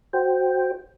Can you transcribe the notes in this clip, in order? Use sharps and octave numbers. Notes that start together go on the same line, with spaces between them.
F#4 C5 G5